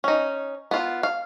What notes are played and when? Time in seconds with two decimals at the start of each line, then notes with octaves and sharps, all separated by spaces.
0.04 C#4 D#4
0.71 B3 F4
1.03 F5